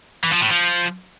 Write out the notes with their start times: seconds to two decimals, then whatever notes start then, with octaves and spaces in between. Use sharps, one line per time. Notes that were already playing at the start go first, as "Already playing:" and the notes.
0.24 E3
0.33 F3
0.42 A2
0.50 F3